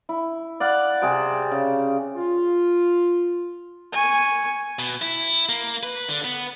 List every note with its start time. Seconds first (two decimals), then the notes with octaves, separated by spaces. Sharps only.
0.09 E4
0.60 D5 F5 F#5
1.01 C3 G#4 C5 G5
1.52 C#3
2.16 F4
3.92 G#5 C#6
4.79 B2
5.02 E4
5.49 A#3
5.83 B4
6.09 D3
6.24 B3